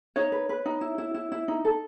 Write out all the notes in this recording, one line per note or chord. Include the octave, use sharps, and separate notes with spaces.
D#4 C#5
B4
B4
D#4
E4
E4
E4
E4
D#4
A4